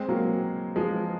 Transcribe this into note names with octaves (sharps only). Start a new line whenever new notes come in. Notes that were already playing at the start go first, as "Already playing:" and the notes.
Already playing: G#3 C4
F#3 A#3
F3 G#3